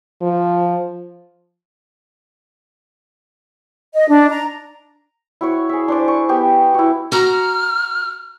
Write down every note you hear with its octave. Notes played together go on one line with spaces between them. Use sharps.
F3
D#5
D4
A#5
E4 F#4 C#5
G#4 E5
D4 C5 D5
C#6
B3 G4
E4 F#4
F#4 A#5 F6